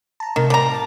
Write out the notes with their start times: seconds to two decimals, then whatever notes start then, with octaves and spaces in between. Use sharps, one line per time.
0.20 A5 A#5
0.36 A2 C3 D#3
0.50 G3 A#4 A#5
0.71 A5 A6